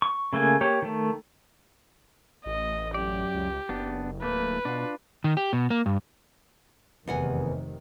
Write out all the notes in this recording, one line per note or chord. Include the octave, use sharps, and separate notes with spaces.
C#6
C#3 A3 A#3 G#5
A#3 G4 C#5
D#3 A3
A1 D#5
F#2 G4 D5
C#2
F#1 B3 D4
D1 A3 A#3 B4
B2 D4 F4
D#3
G4
B2
A#3
G2
F1 E2 C3 D#3 F#5 G#5